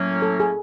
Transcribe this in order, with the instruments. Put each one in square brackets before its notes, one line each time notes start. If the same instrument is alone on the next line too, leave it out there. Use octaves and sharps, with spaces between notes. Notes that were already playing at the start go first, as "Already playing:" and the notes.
Already playing: [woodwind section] A2 F#3 A#3 C#4
[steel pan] A4
G#4